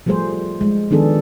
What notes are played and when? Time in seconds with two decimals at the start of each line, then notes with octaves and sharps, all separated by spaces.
0.06 F3 G3 A3 G#4 C5
0.61 G#3
0.91 D#3 F3 B3 D4 G#4 A4